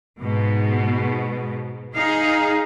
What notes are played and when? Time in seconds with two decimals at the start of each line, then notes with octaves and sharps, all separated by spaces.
0.20 G#2 B2
1.96 D#4 G#4 F5